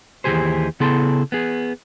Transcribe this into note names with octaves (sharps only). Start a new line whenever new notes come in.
D#2 E3 F#3 G4 G#4 C5
C#3 B3 E4 G#4 A4 C6
B3 G#4